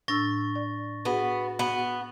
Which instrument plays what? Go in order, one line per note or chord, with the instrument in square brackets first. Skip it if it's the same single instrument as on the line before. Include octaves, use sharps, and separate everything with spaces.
[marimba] A2 D4 E6 [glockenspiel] C#6 A6 A#6
[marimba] D5
[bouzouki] B3 [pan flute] F#4 [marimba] G#4 F#5
[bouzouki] B3